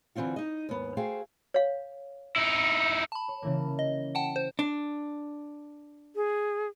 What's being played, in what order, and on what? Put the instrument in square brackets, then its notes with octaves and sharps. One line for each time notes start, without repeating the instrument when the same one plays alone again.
[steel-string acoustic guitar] D3 E3 C4 F4 F#4
D#4 D#5
D#2 G#2 B3
A3 F#4 G#4 C5 F5 G5
[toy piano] C#5 F5
[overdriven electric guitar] D#4 E4
[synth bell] A5 B5
[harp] C#5
C#3 E3 A#3
[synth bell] D#5
F#5 G5 A5
C5
[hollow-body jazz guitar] D4
[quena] G#4